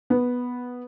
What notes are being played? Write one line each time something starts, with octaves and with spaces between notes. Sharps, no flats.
B3